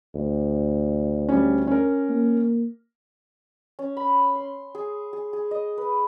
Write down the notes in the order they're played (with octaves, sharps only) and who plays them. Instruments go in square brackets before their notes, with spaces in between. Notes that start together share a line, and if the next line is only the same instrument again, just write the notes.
[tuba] D2
[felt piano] G3 C#4
C#4 A#4
[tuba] A#3
[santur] C#4
B5
C6
G#4
G#4
G#4
D#5
B4